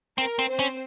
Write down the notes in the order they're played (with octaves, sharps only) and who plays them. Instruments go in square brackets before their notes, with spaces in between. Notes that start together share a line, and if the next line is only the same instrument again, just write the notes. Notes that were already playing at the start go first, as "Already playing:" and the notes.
[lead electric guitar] C4 [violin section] A#4
[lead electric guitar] C4
[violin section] C4 C5
[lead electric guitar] C#4